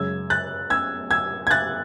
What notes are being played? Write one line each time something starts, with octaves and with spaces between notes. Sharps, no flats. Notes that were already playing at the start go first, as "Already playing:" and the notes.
Already playing: F#2 C#3 G#3 E6 G#6
F#6 A6
E6 G#6
E6 G#6
G#6
F#6 A6